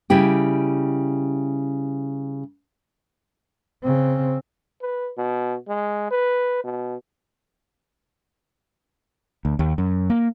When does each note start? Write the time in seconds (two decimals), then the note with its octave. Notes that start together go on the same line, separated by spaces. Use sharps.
0.10 C#3 G3 E4 G4
3.83 C#3 C4
4.81 B4
5.17 B2
5.68 G#3
6.11 B4
6.64 B2
9.45 D2
9.59 D#2
9.78 F#2
10.10 A#3